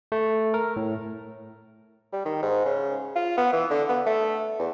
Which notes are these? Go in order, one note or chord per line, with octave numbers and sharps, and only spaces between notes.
A3
A#4
A2
G3
D#3
G#2
C#3
F4
B3
E3
D3
B3
A3
E2